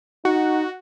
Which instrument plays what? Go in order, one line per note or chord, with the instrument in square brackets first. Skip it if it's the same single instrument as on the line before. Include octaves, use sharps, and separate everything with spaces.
[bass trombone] D#4 [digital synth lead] F#4